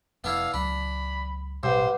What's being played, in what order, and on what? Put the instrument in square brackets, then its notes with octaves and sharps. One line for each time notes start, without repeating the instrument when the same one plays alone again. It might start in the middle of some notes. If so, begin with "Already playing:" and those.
[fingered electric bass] F1 [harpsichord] B3 D4 E4 [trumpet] F5
[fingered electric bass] C#2 F#3 [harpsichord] D4 [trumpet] B5
[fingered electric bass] A1 B2 [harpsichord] G2 [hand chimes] B4 F#5 D6 [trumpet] C5